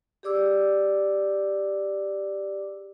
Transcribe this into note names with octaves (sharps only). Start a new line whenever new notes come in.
G4 G#4 D5 D6 E6